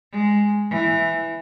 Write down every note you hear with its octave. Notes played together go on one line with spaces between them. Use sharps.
G#3
E3